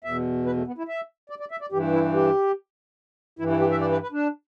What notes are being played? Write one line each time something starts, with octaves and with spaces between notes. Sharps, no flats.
E2 B2 E5
B4
A3
B3
E4
E5
D5
D5
E5
D5
G2 E3 G4
E4
G4
G2 E3 E4
E4
G4
E5
D5
B4
B4
D4